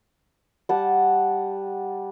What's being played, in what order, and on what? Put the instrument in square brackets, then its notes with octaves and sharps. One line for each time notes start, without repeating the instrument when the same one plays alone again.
[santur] G3 F#5 A5